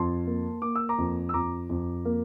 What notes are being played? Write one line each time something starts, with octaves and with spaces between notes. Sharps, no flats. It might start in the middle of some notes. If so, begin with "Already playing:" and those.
Already playing: F2 A5 C6
A#3
A#3 D6
E6
A#5 D6
F2
E6
F2 A#5 D6
F2
A#3